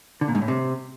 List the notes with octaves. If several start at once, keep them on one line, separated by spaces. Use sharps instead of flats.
D3
A#2
G#2
A2
C3